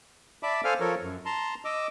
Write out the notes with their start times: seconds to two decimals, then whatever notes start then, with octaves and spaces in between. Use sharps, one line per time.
0.43 D5 E5 A5 B5 D6
0.64 A4 C5 F5 G#5 F6
0.80 F3 A4 A#4 C#5
1.02 F#2
1.26 A5 A#5 C6
1.65 D#5 D6 E6